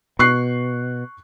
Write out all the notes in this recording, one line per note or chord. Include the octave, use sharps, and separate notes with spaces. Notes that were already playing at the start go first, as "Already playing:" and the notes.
B2 C#6 F#6 C7